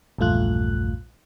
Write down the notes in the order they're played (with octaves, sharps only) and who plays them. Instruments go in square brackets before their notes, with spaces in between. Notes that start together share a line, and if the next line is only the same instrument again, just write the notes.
[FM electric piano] A#1 E2 G2 A3 F4 F#6